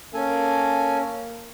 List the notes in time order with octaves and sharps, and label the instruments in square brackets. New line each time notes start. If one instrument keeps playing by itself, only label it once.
[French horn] A#3 [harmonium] C#4 [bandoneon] A4 G#5